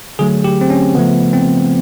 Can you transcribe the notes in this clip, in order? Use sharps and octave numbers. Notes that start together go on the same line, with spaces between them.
D3 F#3 A3 G#4
G4
C4
C#4
C#3 F3 A3 B3
C4